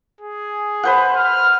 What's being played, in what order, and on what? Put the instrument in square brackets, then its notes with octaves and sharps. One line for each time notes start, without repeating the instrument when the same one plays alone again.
[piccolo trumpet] G#4
[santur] B4 C5 F#5
[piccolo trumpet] F6